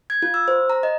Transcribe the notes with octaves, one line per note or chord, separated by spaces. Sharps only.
G#6
F4
E6
C5
A#5
D#5